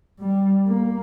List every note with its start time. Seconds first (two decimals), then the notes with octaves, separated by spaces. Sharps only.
0.20 G3
0.68 A#3